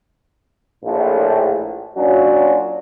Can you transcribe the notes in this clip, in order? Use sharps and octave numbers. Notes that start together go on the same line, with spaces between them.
A#1 A2
A#2 F#3 C#4 D4 F4 F#4